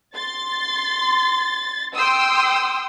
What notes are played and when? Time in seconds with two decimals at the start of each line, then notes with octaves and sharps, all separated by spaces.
0.15 C6 A6
1.94 G5 C6 D#6 E6